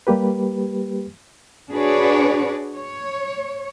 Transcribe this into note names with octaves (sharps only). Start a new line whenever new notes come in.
G3 A#3 G4 B4
D4 F#4 G#4 B4 C#5 D5
C#5